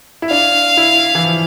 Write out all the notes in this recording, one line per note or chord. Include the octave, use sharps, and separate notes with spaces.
E4
D4 F5
E4
E3
F3